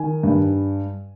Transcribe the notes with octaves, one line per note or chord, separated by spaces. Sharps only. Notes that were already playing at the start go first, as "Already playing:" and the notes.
Already playing: D#3 G#5
G2